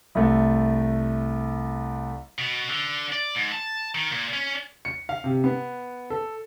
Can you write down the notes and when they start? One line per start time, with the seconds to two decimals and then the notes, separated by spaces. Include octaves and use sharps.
0.15 C2 A3
2.38 B2
2.70 D3
3.12 D5
3.35 G#2
3.52 A5
3.95 D#3
4.12 A#2
4.33 C#4
4.85 C#7
5.09 F5
5.24 C3
5.44 B3
6.10 A4